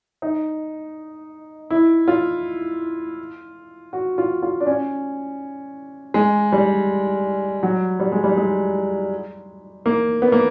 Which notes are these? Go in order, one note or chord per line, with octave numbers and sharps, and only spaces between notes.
D#4
E4
F4
F#4
F4
F4
D4
C#4
G#3
G3
F#3
G3
G#3
G3
G#3
A#3
B3
A#3